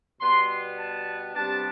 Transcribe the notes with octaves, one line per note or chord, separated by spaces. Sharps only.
B2 G3 B3 C6
A5
C3 G3 B3 D4 A5